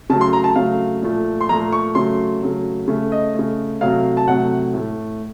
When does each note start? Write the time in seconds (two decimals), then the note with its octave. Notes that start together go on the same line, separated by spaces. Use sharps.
0.10 C#3 F#3 A3 A5
0.21 C6
0.33 A#5
0.44 A5
0.56 C#3 F#3 A3 F5
1.02 A#2 F3 A3
1.41 C6
1.49 A#2 F3 A3 A#5
1.73 C#6
1.95 C#3 F#3 A3 C6
2.42 C#3 F#3 A3
2.88 C#3 A3
3.12 D#5
3.34 C#3 A3
3.81 C3 F#3 A3 F5
4.17 A5
4.28 C3 F#3 A3 F#5
4.74 A2 A3